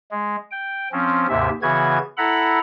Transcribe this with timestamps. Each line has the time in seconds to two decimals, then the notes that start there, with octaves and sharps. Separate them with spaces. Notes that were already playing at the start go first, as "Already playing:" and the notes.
0.11 G#3
0.51 G5
0.92 F3 C4 C#4
1.29 D#2 G#2 C3 E5
1.62 C#3 E3 B3 F#4 G#6
2.17 E4 A4 F#5 A#5 B5